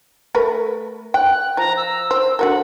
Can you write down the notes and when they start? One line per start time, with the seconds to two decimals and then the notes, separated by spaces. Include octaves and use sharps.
0.35 A3 A#4 B4
1.14 G5 F#6
1.57 F3 A#5
1.77 E6
2.11 C5
2.39 D3 F#4 A#4 F#5